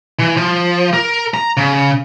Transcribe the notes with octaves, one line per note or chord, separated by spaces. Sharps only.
E3
F3
A#4
A#5
C#3